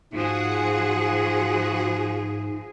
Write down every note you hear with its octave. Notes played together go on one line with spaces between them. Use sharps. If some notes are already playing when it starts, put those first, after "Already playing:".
G#2 F3 F#4 G#4 F#5